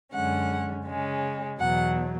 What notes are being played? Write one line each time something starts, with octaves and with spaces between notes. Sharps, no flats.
F#2 D3 G#3 C#4 F#5
C#3 G#3 C#4
E2 B2 F#3 F#5